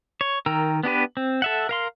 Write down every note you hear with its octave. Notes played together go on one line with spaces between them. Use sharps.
C#5
D#3 A#4 G5 A#5 E6
B3 D4 G4 B4
C4
A4 E5 F#5
A#4 F5 C6